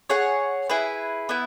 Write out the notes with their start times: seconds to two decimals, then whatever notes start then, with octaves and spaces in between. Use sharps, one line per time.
0.10 G#4 C#5 F#5
0.70 E4 G#4 B4
1.29 B3 E4